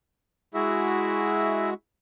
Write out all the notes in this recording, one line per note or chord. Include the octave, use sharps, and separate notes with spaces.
G#3 E4 F#4 G#4 E5